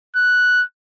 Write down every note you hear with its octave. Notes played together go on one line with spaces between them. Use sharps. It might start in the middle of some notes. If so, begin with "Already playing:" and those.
F#6